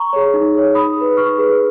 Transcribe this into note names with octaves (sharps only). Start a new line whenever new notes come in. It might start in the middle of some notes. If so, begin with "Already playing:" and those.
Already playing: A#5 C#6
G#4 C#5
D#4
G#4 C#5
D#4 B5 D#6
G#4 B4
D#4 C#6 F6
G#4 B4